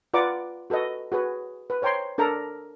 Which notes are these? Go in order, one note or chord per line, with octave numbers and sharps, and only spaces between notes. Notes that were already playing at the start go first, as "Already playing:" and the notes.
F4 B4 D5 F#5 A#5 D6
F#4 A4 B4 D#5
F#4 G#4 B4
B4
C5 C#5 G5 A#5 C6
D4 A4 A#4 A#5